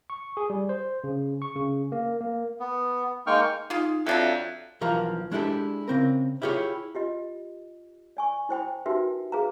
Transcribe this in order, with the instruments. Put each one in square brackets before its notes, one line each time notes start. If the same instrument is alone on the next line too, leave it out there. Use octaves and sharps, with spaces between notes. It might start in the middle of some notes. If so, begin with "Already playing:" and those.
[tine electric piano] C#6
G#4
G3
C5
C#3
C#6
C#3
A#3
A#3
[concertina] B3
G#3 A#3 D#4 G5 C#6 F6
[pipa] G#3 F4 [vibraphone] D#4
[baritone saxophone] F2 [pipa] F#3 D4 A4 [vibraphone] E5
[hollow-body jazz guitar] B1 E3 F3 A#4 F5
G#3 D4 E4 G4 A4
C#3 C4 A#4
E4 F4 G4 G#4 C#5
[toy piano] F4 G4 D#5
D5 G#5 C#6
E4 C5 G5 B5
D#4 F#4 G4 A#4 B4 E5
G#4 B4 F5 A#5